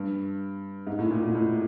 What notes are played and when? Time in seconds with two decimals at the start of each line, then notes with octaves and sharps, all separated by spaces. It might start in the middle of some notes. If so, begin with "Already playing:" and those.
Already playing: G2
0.87 G#2
0.99 A2
1.11 A#2
1.23 A#2
1.35 A2